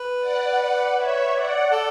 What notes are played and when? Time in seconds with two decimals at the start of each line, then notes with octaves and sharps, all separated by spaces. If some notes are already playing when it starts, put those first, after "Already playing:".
Already playing: B4
0.20 D5 F#5
0.96 C#5 E5
1.34 D5 F#5
1.72 A4